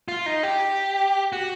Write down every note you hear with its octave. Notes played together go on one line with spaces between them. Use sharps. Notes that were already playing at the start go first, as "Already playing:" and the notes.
F4
D#4
G4
F#4